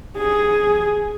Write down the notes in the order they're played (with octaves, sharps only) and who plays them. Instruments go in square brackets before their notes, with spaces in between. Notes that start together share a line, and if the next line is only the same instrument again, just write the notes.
[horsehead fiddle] G#4